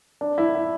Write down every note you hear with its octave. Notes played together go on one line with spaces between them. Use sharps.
D4
E4
E4